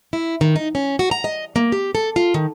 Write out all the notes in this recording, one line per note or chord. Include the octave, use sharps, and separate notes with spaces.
E4
D#3
D#4
C#4
F#4
A#5
D#5
A#3
G4
A4
F4
D#3